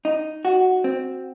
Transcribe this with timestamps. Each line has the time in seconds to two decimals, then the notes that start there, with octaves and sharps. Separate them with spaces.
0.05 D#4
0.45 F#4
0.84 C4